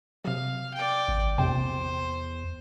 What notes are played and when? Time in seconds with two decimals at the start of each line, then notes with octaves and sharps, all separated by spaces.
0.25 C3 F#3 F5
0.75 D5 G5
1.08 G#1
1.38 A#1 E2 C3 C5 G5